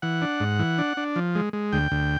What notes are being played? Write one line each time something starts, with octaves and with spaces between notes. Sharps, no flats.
E3 F#5
D4
G#2
E3
D4
D4
F3
G#3
G#3
D2 G5
D2